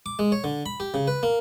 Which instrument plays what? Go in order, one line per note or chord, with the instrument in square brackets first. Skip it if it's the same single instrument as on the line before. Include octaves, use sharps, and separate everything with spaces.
[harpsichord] D6
G#3
C#5
D3
B5
G4
C#3
B4
A#3